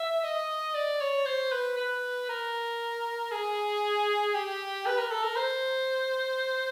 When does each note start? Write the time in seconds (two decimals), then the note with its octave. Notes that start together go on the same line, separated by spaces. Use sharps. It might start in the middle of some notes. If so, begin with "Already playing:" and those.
Already playing: E5
0.24 D#5
0.74 D5
1.01 C#5
1.26 C5
1.52 B4
1.77 B4
2.29 A#4
3.32 G#4
4.34 G4
4.86 B4
4.98 A#4
5.11 A4
5.23 A#4
5.36 C5